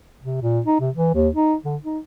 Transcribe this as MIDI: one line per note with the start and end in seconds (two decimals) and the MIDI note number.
0.24 0.41 48
0.42 0.60 46
0.66 0.78 63
0.80 0.90 48
0.95 1.13 52
1.14 1.29 39
1.35 1.55 63
1.65 1.76 50
1.84 1.99 63